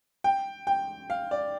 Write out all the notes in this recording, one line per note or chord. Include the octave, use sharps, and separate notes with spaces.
G5
G5
F5
D5